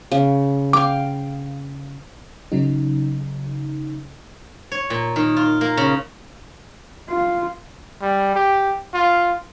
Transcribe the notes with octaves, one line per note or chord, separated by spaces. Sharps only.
C#3
F5 G5 D6
C#3 F#3 D#4
C#5
A#2
D#3
F4
A#3
C#3
F4
G3
G4
F4